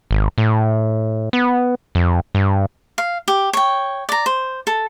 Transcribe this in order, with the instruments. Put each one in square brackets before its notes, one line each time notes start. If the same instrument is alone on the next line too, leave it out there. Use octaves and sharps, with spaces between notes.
[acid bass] G#1
A2
B3
F2
G2
[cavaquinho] F5
G4
C#5 G5
D5 A#5
C5
A4